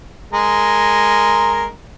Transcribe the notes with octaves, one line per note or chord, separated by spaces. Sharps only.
G#3 A#4